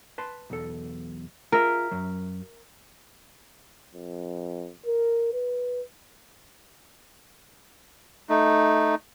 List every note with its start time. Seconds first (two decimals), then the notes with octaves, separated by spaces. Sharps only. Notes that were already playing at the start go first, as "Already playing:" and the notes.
0.18 B4 A5 C6
0.50 B1 E2 A4
1.52 F4 G#4 A#4 E5
1.91 F#2 F#3
3.94 F2
4.86 A#4
5.33 B4
8.29 A3 D#4